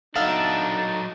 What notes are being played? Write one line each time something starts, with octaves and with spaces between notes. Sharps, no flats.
F#3 B3 D4 D#4 A4 E5 F5